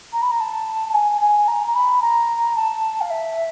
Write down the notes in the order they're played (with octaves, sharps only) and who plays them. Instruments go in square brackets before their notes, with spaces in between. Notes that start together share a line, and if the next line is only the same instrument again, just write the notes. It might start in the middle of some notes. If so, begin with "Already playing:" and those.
[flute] A#5
B5
A#5
A5
A5
G#5
G#5
A#5
A#5
B5
A#5
A5
F5
E5